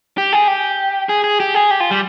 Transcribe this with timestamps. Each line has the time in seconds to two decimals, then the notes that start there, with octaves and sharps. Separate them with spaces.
0.18 G4
0.33 G#4
0.48 G4
1.09 G#4
1.24 G#4
1.40 G4
1.55 G#4
1.71 G4
1.80 F4
1.91 G3